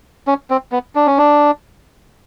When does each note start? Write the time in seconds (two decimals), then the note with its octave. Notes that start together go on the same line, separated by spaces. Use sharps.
0.27 C#4
0.50 C4
0.72 B3
0.95 D4
1.07 C#4
1.18 D4